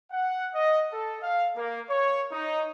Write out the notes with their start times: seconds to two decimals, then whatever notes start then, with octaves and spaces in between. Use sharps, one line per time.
0.11 F#5
0.55 D#5
0.92 A4
1.22 F5
1.57 A#3
1.89 C#5
2.32 D#4